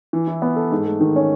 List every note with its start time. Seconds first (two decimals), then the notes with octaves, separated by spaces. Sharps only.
0.13 E3
0.27 E4
0.42 B3
0.56 A4
0.72 G#2
0.86 A3
1.00 D#3
1.16 C#4